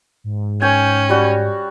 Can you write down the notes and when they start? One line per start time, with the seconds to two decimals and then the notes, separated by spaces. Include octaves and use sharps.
0.24 G#2
0.62 C#4 C#5 G5 G#5
1.09 G3 F#4